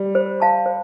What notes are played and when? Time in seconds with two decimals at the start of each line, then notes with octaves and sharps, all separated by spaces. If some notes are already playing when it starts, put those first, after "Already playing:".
Already playing: G3
0.15 C5
0.40 F5 A5 C6
0.66 C5